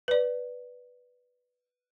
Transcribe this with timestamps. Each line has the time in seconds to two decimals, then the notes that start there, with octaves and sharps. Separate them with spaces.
0.08 B4 D5